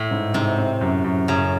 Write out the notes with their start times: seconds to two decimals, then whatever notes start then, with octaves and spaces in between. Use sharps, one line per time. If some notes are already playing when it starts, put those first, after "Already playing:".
Already playing: A2
0.11 G#2
0.34 G#2 C3
0.58 C4
0.81 F#2
1.04 F#2
1.28 F#2 C#3